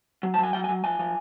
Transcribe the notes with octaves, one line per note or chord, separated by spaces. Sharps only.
F#3
A5
F#3
G#5
F#3 G5
G#5
F#3
F3 G#5
F3